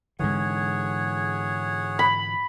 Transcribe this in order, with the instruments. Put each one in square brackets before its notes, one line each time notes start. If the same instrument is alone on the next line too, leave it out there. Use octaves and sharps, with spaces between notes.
[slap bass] G#2 D3 E3 [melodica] G#4 C#5 F#5
[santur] B5